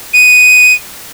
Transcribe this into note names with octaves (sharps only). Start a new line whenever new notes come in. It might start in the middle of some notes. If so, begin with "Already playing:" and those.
D#7